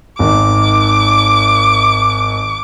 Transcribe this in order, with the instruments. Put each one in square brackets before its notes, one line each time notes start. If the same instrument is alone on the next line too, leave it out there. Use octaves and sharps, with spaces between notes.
[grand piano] G#1 D#3 [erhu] D6